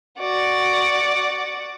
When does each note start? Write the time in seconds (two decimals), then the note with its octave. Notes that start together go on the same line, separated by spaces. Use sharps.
0.19 F#4 D5